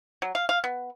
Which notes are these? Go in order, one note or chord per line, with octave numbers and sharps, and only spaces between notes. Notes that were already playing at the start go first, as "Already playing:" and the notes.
F#3
F5
F5
B3